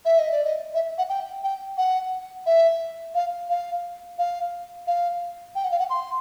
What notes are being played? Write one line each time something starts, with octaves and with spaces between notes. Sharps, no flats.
E5
D#5
D5
D#5
E5
F#5
G5
G5
F#5
E5
F5
F5
F5
F5
G5
F#5
F5
F#5
C6